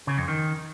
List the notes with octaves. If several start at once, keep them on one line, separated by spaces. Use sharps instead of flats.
C#3
F2
D#3